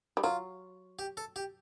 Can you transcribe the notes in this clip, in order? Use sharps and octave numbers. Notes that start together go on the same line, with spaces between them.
G3
F#3 F4
G4
A4
G4